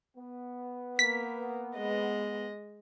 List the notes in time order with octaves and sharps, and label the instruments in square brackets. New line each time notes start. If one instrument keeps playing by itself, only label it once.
[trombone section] B3
[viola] A#3 [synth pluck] B6
[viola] G#3 D#5